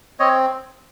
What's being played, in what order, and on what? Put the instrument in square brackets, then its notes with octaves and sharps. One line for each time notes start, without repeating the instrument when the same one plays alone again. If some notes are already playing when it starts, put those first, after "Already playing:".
[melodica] C4 C#5 D#5